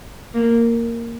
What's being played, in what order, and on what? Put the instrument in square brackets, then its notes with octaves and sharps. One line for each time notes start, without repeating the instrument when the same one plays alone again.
[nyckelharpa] A#3